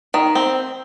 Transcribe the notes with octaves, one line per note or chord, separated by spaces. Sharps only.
D#3
C4